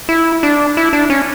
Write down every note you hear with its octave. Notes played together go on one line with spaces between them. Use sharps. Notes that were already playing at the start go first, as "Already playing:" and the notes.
E4
D4
E4
D4
C#4